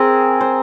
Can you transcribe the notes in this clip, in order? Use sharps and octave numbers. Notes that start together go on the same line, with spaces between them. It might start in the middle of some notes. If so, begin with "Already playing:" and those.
Already playing: C4 G#4 A#4 C5
C5